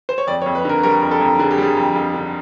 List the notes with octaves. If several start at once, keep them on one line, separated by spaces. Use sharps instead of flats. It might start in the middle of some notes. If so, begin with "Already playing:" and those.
C5
C#5
F2 D5
C#5
F2
B4
D3 A#4
G3 A#4
F2
A4
F2
D3 G#4
G4
G3 G#4
F2
F2
D3